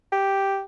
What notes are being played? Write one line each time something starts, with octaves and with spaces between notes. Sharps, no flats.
G4